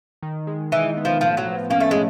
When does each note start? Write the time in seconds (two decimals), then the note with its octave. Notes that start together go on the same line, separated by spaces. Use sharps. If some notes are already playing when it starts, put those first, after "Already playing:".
0.23 D#3
0.47 G#3
0.72 E3 D#4
0.97 B3
1.05 F3
1.21 A2 F3
1.37 F#3
1.45 F3
1.70 A#3 C#4
1.80 A3
1.91 G#3 A3